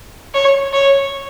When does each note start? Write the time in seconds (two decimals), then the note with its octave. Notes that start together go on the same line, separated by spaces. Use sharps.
0.34 C#5
0.73 C#5